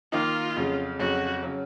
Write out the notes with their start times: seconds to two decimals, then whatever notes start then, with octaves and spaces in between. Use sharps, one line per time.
0.12 D#3 A#3 D#4 F4
0.57 F2 C#3 F#3
0.99 F2 C#3 F#3 F#4
1.43 C#3 F#3